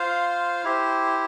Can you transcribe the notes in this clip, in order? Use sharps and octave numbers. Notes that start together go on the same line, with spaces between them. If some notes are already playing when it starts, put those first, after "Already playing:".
Already playing: F4 C5 F5
E4 G4 C5